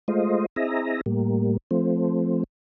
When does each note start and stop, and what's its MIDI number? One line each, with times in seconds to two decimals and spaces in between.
0.08 0.46 56
0.08 0.46 57
0.08 0.46 65
0.08 0.46 72
0.08 0.46 75
0.56 1.01 60
0.56 1.01 64
0.56 1.01 68
0.56 1.01 75
0.56 1.01 76
0.56 1.01 82
1.06 1.57 45
1.06 1.57 55
1.06 1.57 58
1.71 2.44 53
1.71 2.44 57
1.71 2.44 60